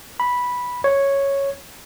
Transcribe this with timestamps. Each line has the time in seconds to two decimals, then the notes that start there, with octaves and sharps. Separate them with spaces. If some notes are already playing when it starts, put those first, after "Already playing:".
0.20 B5
0.84 C#5